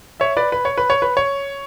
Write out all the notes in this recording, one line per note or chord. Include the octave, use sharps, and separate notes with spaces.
C#5 E5
B4 D5
B4
C#5
B4
C#5
B4
C#5